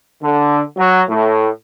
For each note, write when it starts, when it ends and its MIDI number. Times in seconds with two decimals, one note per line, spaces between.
0.22 0.61 50
0.76 1.00 54
1.08 1.48 45